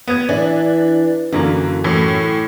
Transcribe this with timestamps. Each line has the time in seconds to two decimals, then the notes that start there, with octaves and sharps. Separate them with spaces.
0.08 B3 G#6
0.29 E3 D4
1.32 F#2 D3 E3 A#3
1.84 A2 E3